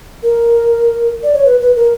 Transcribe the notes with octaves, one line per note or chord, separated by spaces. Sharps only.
A#4
D5
C#5
B4
B4
A#4